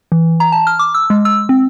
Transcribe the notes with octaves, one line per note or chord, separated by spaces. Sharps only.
E3
A#5
A5
F6
D6
E6
G#3
E6
C4